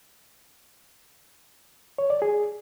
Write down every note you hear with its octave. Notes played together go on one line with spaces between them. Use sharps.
C#5
D5
G#4